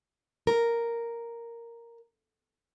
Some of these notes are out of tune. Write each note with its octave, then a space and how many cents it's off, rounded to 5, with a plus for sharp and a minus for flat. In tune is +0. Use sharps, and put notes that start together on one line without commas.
A#4 -5